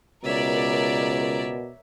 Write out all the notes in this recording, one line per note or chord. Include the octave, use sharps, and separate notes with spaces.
C#2 B2 A#4 C#5 D5 E5